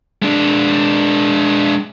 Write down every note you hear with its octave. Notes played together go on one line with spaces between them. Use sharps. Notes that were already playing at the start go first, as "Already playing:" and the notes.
G#3 D4